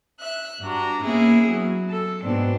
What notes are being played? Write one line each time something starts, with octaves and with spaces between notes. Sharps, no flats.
E5 F#6
G2 D4 F#4 A#5
A#3 B3 C#4 E4 G#4
F#3
A4
G#2 B2 B3 C4 D4